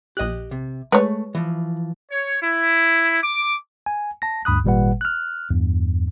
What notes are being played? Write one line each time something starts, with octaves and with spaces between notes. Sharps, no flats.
A#1 G4 D#5 F#6
C3
G#3 A3 B4 C#5
E3 F3
C#5
E4
D6
G#5
A5 A#6
D2 G2 B5 D#6 F#6
G#1 A#2 G3 B4 F#5
F6 F#6
E2 G2